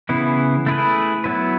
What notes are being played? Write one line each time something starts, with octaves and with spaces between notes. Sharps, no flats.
C#3 E3 B3 E4
A3 E4 G#4 B4
F#3 B3 E4 B4